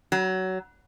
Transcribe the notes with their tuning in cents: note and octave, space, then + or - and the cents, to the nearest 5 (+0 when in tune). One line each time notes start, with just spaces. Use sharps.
F#3 +20